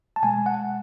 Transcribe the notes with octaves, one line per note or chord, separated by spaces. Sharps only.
A5
B2 G#3 G#5
F#5